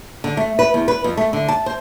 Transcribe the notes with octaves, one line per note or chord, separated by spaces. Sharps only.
D3
A3
B4
E2
B4
F2
A3
D3
A5
C5